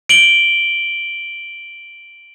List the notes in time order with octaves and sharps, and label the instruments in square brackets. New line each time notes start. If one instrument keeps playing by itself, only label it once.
[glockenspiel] D7 F#7 G7